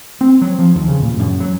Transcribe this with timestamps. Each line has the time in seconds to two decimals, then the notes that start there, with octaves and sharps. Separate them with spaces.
0.21 C4
0.42 F#3
0.59 F3
0.75 D#2
0.88 C#3
1.02 A#2
1.19 F#2
1.40 F#3